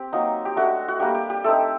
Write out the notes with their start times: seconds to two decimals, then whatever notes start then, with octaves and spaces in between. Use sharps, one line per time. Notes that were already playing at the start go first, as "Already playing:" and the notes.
Already playing: C4 G4
0.13 F#3 A#3 D#4
0.45 G4
0.56 A3 D4 F#4
0.88 F#4
1.00 G3 A#3 D4 G4
1.15 G4
1.30 G4
1.44 A3 C4 D#4 A4